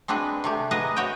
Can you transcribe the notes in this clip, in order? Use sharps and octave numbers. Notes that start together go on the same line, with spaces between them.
G#3 C4 D4 F#4 B4
C3 A3 G4
G#4 A#4 B4 D#5 F#5
F#4 C#5 D#5 G5